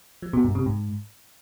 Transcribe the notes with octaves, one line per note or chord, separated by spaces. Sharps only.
F3
B2
G2
C3
G#2